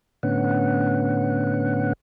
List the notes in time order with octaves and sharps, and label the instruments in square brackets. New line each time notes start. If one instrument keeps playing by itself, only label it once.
[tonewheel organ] A2 D3 B3 C#4 F#5